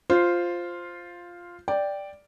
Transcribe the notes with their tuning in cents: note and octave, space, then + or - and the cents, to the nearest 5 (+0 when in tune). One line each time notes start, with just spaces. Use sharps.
F4 +0 C5 +0
D5 +0 G5 +0